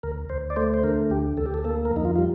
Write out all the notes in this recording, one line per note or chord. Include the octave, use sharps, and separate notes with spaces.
D2 A#4
D2 C5
D5
A3 C5
C5
D3 A#4
D2 G4
D2 A4
G4
A4
A#3 A4
A#4
F2
D#4
F4
G3 F4